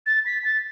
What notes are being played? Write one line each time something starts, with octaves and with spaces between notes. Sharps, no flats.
A6
B6
A6